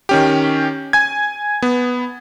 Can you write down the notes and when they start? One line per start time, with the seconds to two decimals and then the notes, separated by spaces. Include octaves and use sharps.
0.09 D#3 C#4 G4
0.93 G#5 G#6
1.62 B3